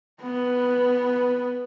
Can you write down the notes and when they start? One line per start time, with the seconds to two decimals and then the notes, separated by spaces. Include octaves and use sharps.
0.23 B3 B4